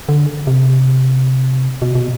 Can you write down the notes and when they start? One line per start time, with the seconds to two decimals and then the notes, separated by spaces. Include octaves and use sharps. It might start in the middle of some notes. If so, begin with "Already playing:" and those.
0.09 D3
0.47 C3
1.82 B2
1.95 B2